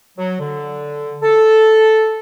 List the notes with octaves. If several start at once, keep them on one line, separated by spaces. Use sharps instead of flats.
F#3
D3
A4